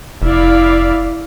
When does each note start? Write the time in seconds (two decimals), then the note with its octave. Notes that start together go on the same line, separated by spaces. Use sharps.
0.22 F1 E4 D5 F5